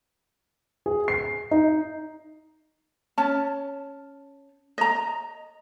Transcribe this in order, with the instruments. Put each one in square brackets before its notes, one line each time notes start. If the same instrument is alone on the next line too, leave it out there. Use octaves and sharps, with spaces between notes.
[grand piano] G#4
C7
D#4
[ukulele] C#4 A5
D#5 A#5